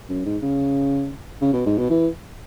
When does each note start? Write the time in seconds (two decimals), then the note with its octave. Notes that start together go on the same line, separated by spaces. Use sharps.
0.09 F#2
0.26 G#2
0.42 C#3
1.42 C#3
1.53 B2
1.66 G#2
1.78 B2
1.90 E3